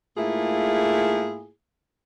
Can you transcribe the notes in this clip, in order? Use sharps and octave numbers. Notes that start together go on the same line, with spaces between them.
G#2 A3 A#3 E4 F4 G#4